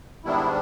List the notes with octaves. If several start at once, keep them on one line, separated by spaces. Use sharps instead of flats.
G#2 D#3 G3 B3 D4 E4